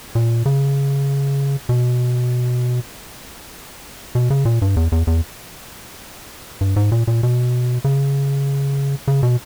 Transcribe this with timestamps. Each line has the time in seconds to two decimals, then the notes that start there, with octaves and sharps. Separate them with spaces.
0.15 A#2
0.46 C#3
1.69 B2
4.15 B2
4.30 C#3
4.45 A#2
4.62 G2
4.77 E2
4.92 E2
5.07 E2
6.61 G2
6.76 G#2
6.92 A#2
7.07 A#2
7.23 B2
7.84 C#3
9.08 C#3
9.23 B2